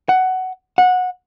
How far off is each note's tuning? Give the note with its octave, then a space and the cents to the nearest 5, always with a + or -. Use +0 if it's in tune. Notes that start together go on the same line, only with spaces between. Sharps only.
F#5 +15
F#5 -20